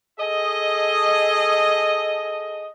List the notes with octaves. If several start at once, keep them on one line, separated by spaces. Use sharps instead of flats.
G#4 A4 D#5